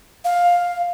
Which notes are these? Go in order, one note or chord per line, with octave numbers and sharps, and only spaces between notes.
F5